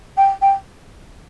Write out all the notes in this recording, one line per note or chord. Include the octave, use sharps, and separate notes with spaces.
G5
G5